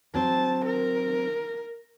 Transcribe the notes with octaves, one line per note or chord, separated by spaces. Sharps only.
F#3 C4 C5 A5
A#4